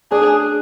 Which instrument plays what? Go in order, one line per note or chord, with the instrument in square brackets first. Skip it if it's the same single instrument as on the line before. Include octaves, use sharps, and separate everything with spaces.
[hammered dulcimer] D4 [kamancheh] G#4